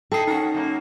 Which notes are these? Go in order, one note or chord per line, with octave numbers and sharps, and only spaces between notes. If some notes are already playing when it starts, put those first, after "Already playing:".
D#4 E4 A4 D#5 G5 C7
C#4 D#4 F#4 A#4
F#2 A#3